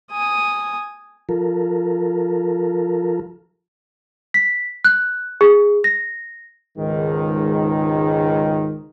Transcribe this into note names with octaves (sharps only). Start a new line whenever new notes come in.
G#5 D#6
F3 F4 A4 A#4
B6
F#6
G#4
A#6
C#2 G#2 D#3